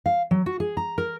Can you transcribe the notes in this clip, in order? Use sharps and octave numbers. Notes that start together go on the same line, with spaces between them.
F5
F#3
F#4
G#4
A#5
A#4